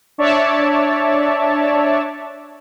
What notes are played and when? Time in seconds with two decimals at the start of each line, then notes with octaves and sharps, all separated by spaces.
0.18 D4 C#5 D5 E5 A5